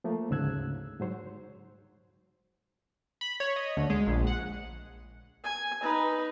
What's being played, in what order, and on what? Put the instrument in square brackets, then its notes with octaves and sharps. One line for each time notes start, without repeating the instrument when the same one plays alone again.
[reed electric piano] F3 A3 A#3
D2 G#2 C#3 E6 F#6 G#6
G#2 F#3 C5 C#5
[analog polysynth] B5
C#5
D#5
D2
G#3
A#1
F#5
[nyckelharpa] G#5
D#4 B4